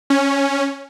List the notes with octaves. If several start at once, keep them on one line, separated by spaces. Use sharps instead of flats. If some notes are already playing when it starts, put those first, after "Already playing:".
C#4